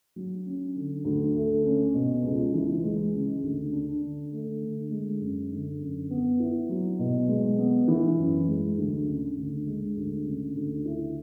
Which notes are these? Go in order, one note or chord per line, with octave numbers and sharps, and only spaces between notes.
F#3
C#4
D3
D2
A3
C#4
B2
C#2
E3
G#3
C#3
D2
D4
D3
A3
D3
G#3
F#2
D3
F#2
B3
E4
F#3
B2
G#3
B3
E3
F#2
G#3
D2
C#3
D2
G#3
D2
C#3
D2
E4